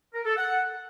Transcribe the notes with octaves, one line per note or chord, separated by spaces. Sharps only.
A#4
A4
F#5